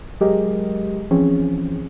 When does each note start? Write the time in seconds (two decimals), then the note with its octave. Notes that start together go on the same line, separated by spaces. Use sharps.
0.21 F#3 G#3 G4 G#4 A#4 D#5
1.11 E3 F3 C4 C#4 G#4